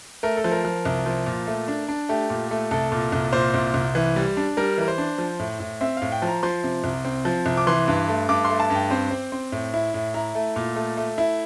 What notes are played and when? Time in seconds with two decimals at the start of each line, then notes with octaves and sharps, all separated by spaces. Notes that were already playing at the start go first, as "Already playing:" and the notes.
0.23 A3 A#4
0.37 A4
0.44 F3
0.52 A#4
0.65 F3
0.85 C2
1.06 F3
1.26 A#2
1.47 A3
1.68 D4
1.88 D4
2.09 A3 G4
2.30 A#2
2.51 A3
2.71 C2 A4
2.92 A#2
3.12 C2
3.32 A#2 C5
3.54 C2
3.74 C2
3.95 E3
4.16 G3
4.37 D4
4.57 G3 A#4
4.78 E3 A#4
4.88 C5
4.98 D4
5.18 F3
5.39 A2
5.60 A2
5.81 C4 E5
5.97 A2 F5
6.12 G5
6.22 F3
6.27 A#5
6.43 F3 C6
6.64 C3
6.84 C2
7.05 C4
7.25 F3
7.46 C2
7.57 D6
7.67 E3 C6
7.88 G2
8.08 A3
8.29 G2 D6
8.45 A3 C6
8.60 A5
8.70 G2
8.75 G5
8.91 C4 C5
9.11 C4
9.32 C4
9.52 A2
9.74 E4
9.94 A2
10.14 E4 A#5
10.35 A3
10.56 A#2
10.76 A3
10.97 A3
11.18 E4